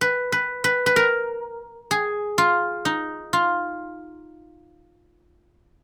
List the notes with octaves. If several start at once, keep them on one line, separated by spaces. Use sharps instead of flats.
B4
B4
B4
B4
A#4
G#4
F4
D#4
F4